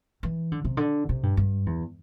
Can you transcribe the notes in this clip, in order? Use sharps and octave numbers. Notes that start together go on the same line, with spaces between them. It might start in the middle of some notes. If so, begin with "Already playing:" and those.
E3
D3
C3
D3
C3
G2
G2
E2